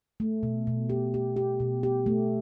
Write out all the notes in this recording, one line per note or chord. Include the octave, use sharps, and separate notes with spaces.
A3
B2
B2
G4
G4
G4
B2
G4
A3